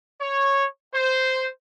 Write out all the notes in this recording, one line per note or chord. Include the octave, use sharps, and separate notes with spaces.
C#5
C5